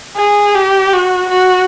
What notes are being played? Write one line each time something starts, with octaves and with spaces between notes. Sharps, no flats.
G#4
G4
F#4
F#4